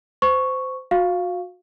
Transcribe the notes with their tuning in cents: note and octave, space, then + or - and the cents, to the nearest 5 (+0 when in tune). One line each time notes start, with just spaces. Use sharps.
C5 -25 C#6 +0
F#4 -30 F5 +0 C#6 +0